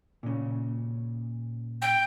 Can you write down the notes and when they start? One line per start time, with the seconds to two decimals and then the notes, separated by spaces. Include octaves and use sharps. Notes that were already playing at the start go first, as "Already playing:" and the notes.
0.23 A#2 C#3
1.81 G5